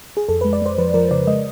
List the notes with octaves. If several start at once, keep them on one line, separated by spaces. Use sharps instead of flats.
G#4
F2 A4
G#3 B4
D5
G#3 C5
F3 B4
F3 A#4
C#3 D5
G#3 D#5